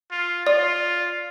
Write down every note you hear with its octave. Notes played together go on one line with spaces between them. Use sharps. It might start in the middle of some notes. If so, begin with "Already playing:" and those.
F4
F4 D5